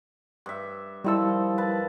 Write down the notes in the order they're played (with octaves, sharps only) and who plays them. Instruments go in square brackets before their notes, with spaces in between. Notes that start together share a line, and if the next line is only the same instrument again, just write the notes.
[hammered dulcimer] G2 E5
[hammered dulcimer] D#3 F3 A4 [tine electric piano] G3 E4 E6
[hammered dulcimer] B4 A5